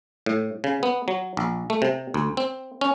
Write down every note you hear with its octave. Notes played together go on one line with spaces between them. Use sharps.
A2
C#3
B3
F#3
A#1
A3
C3
D2
C4
C#4